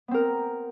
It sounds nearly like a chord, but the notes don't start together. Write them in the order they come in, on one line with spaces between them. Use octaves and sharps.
B3 C4 A#4